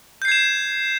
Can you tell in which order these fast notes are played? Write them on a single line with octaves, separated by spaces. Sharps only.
G6 C7 G#6 E7